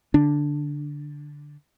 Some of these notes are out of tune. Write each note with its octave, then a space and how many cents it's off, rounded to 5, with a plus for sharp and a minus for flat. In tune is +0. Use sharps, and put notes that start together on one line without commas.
D3 -5 D4 +0